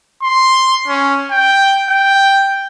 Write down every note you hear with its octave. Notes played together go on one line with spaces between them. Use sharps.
C6
C#4
G5
G5